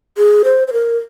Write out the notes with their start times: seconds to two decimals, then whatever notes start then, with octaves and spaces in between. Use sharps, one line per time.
0.17 G#4
0.44 C5
0.68 C5
0.73 A#4